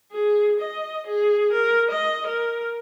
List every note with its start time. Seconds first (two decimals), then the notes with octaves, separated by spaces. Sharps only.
0.11 G#4
0.60 D#5
1.07 G#4
1.52 A#4
1.91 D#5
2.27 A#4